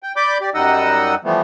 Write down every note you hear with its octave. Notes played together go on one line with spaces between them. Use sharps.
G5
D5 B5 D6 G6
G4 D5
F#2 G3 D#4 D#5 F#5 E6
E3 F3 G3 A3 B3